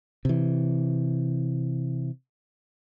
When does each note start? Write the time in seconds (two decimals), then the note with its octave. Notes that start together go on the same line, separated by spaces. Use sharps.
0.25 C3 E3